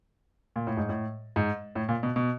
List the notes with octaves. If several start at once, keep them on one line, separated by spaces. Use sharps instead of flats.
A#2
A2
G#2
A2
G#2
A2
A#2
B2
B2